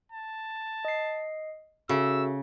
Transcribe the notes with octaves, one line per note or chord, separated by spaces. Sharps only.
A5
D#5 C7
C#3 F#4 A4 E5 E6